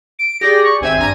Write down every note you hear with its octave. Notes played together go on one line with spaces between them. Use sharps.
D7
G4 G#4 D5 A#6
C#6
G#1 C4 E5 G#5
G2 A#5 D#7